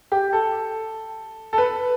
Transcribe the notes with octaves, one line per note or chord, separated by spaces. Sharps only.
G4
A4
A4
B4